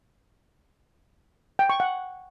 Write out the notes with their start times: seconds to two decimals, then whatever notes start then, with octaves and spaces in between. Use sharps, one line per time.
1.59 G5
1.70 C#6
1.80 F#5